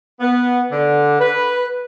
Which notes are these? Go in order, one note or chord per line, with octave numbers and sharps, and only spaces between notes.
B3
D3
B4